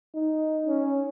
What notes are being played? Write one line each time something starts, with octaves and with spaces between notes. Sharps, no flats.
D#4
C#4